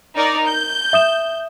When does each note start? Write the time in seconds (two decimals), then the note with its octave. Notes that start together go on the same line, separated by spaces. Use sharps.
0.15 D#4 A#4 D5
0.47 G6
0.93 E5 D#6 E7